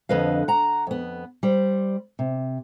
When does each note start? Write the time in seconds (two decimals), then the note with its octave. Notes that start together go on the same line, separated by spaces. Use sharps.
0.09 F2 D3 B4 D#5 F5
0.48 F#5 A#5
0.87 F2 B3
1.43 G3 C5
2.19 C3